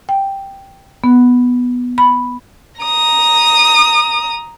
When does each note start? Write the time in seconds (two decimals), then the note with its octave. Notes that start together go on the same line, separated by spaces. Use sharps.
0.09 G5
1.04 B3
1.98 B5
2.81 A#5 D#6